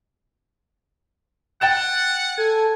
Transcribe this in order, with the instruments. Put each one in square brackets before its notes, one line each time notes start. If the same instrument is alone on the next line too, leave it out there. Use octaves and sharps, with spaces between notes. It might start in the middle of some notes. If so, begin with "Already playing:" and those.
[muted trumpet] F#5 [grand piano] G5 A6 E7
[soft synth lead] A4 [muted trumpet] G#5